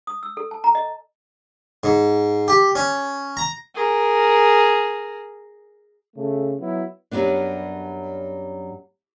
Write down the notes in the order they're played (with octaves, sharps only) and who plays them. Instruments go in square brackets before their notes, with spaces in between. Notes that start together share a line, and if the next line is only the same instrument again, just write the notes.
[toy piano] D#6
E6
A4
A5
A#5
D#5
[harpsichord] G#2
G4
C#4
A#5
[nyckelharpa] G#4 A#4
[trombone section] C#3 A3
F#3 B3 E4
[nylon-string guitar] F#2 F#3 G3 B3 D4